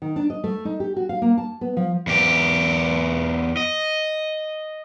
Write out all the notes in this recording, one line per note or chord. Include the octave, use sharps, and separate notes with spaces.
D#3
D4
D#5
A3
D#4
G4
F#4
F5
A#3
A5
B3
F3
E2 G4
D#5